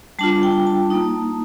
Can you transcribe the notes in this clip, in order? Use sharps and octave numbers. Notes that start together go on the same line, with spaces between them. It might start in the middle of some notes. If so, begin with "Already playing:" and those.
G3 D4 F4 A5
G5
A5
A#3 D#4